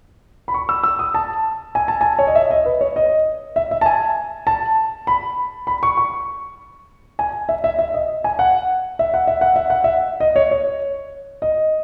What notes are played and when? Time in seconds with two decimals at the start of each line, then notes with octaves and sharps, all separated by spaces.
0.48 B5
0.54 C#6
0.69 E6
0.84 E6
0.99 D#6
1.14 A5
1.75 G#5
1.88 A5
2.01 G#5
2.19 C#5
2.27 D#5
2.35 E5
2.51 D#5
2.66 B4
2.81 C#5
2.96 D#5
3.56 E5
3.71 E5
3.81 A5
3.86 G#5
4.47 A5
5.07 B5
5.67 B5
5.83 C#6
5.97 C#6
7.19 G#5
7.49 E5
7.64 E5
7.79 E5
7.94 D#5
8.24 G#5
8.39 F#5
8.99 E5
9.14 F#5
9.27 E5
9.41 F#5
9.56 E5
9.70 F#5
9.84 E5
10.20 D#5
10.36 C#5
10.51 C#5
11.42 D#5